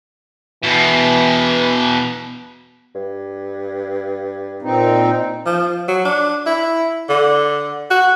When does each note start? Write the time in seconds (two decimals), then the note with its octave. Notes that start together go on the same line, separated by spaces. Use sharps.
0.63 E2 B2 E3
2.95 G2
4.62 A#2 C4 D#4
5.46 F3
5.88 F#3
6.05 D4
6.46 E4
7.09 D3
7.91 F#4